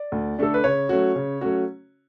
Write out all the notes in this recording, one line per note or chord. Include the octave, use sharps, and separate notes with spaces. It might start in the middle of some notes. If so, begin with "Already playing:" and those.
Already playing: D5
D2
D3 A3 D4 A4
B4
C#3 C#5
F#3 A3 C#4 F#4
C#3
F#3 A3 C#4 F#4